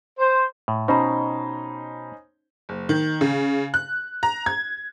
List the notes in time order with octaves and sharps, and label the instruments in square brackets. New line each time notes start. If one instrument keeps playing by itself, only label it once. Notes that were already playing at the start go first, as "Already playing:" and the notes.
[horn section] C5
[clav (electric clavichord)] A2
[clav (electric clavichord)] B2 [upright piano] C#4 D#4 C5 [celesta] A#5 B5
[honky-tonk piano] F#1
D#3
C#3
F#6
A#5
G#6